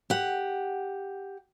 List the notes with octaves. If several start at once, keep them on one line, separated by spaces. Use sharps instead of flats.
G4 F#5